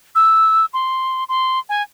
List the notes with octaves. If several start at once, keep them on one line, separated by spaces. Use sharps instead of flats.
E6
C6
C6
G#5